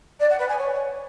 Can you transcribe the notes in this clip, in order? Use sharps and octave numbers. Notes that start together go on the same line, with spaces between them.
D5
F#5
B4
G#5
C#5